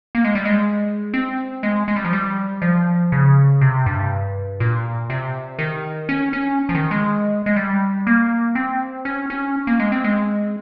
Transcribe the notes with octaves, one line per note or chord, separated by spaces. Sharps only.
A#3
G#3
G3
G#3
C4
G#3
G#3
G3
F3
G3
F3
C#3
C3
G2
A#2
C3
D#3
C#4
C#4
F3
D#3
G#3
G#3
G3
A#3
C4
C#4
C#4
A#3
G#3
C4
G#3